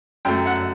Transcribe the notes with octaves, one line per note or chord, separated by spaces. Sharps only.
F#2 F#3 A3 G5
F#5